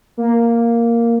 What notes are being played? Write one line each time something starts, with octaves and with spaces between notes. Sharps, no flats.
A#3